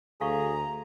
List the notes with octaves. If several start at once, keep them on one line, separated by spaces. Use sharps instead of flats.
D2 G#4 A4 F5 A#5 C#6